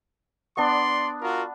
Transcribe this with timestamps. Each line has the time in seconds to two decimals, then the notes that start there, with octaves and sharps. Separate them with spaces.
0.57 B3 D4 D5 C6
1.21 F4 F#4 A#4